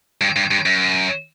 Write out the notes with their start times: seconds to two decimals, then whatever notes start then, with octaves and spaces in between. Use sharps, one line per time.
0.21 G2
0.36 G2
0.51 G2
0.66 F#2